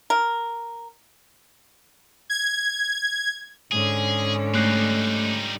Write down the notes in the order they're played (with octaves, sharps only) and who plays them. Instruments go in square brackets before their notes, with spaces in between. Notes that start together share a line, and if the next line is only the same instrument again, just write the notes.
[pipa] A#4
[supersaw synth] G#6
[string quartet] G#2 D3 C#4 [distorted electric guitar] G#4
[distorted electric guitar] G3 D#4 [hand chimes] A3 F#6 C7